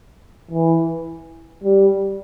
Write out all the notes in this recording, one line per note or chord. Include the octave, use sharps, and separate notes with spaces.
E3
G3